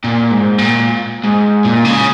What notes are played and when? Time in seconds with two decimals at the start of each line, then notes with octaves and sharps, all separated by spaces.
0.04 A#2
0.31 G#2
0.58 A#2
1.24 G#2
1.64 A#2
1.85 C#3